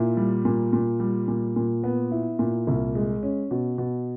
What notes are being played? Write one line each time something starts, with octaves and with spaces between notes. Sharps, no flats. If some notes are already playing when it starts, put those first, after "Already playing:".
Already playing: A#2 E4
G3
A#2
A#2
G3
A#2
A#2
B3
E4
A#2
C2
G#3
C#4
B2
B2